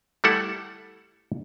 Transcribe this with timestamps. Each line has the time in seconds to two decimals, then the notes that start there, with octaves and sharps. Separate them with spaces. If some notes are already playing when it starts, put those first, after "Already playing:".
0.24 G3 A3 E4 A4 F#5